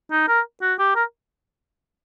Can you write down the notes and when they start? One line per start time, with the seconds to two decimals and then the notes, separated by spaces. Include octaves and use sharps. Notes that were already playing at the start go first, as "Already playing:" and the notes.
0.11 D#4
0.28 A#4
0.62 F#4
0.79 G4
0.96 A#4